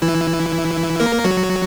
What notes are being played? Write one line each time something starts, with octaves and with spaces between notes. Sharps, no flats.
E3 E4
A#3 A#4
F#3 F#4